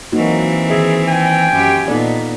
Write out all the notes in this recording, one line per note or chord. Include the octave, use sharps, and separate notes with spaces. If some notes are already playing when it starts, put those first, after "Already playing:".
E3 F#3 A#3 C4 D#4 F#4
D#3 G#4 E5
G5 G#5
F#2 G4
A#2 B3 D#4 A4 D5